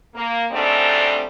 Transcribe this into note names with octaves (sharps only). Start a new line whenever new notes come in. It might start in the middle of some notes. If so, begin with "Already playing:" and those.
A#3
G#2 B2 G3 A3 C4 D4